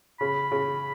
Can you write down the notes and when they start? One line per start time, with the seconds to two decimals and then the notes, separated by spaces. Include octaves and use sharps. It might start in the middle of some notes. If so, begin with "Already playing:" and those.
0.20 C#3 B5
0.52 C#3